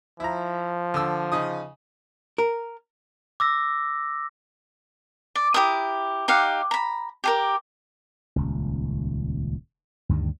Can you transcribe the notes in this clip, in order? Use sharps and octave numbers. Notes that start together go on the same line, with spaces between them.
F3 E4 A#5
D3 E6
C#3 D#4 D#6
A#4
D6 E6 A#6
D5
E4 G4 A#4 D#6
D#4 G4 F5 F#5
A#5 B5
G4 G#4 A#4
D#1 C#2
D2 G2 D#3 G3